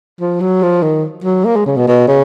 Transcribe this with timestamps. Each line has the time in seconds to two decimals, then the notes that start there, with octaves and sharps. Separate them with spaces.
0.21 F3
0.41 F#3
0.62 F3
0.82 D#3
1.24 F#3
1.45 A#3
1.56 G#3
1.66 C#3
1.77 B2
1.87 B2
2.08 C#3